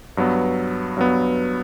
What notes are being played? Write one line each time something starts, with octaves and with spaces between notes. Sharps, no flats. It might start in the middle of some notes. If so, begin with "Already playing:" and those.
G2 F#3 B3
G2 F#3 B3